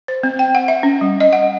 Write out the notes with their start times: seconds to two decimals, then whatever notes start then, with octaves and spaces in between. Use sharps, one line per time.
0.08 C5
0.23 C4
0.39 G5
0.55 F#5
0.68 E5
0.83 C#4
1.01 G3
1.20 D#5
1.33 F#5